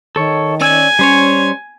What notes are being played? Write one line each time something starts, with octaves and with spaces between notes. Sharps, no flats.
D#3 A4 C#5
C#4 D5 G#5 E6
G3 C#4 C5 C#5